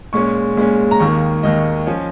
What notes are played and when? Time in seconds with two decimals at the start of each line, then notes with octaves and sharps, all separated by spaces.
0.13 A#2 G#3 C#4 C#6
0.57 A#2 G#3 C#4
0.91 A#5
1.00 D#2 D#3 A#3 C#6
1.43 D#2 D#3 A#3 D#5
1.87 F3 C#4